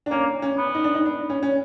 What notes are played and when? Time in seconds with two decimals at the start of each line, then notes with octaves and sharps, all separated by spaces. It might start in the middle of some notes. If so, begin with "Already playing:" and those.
0.06 D4
0.11 A#3 C#4
0.42 C#4
0.58 B3
0.75 D#4
0.84 D4
0.95 D#4
1.05 D4
1.30 C#4
1.43 C#4